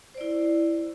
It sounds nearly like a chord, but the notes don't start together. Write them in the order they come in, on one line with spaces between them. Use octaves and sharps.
C5 D5 E4